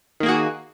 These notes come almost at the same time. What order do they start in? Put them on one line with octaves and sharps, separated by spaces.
D#3 A#3 G#4 F#4